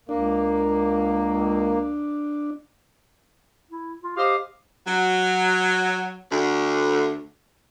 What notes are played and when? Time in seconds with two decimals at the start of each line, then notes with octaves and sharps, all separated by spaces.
0.09 C#2 A#3 D4
3.71 E4
4.03 F4
4.17 G4 C5 D#5 F5
4.87 F#3
6.32 D2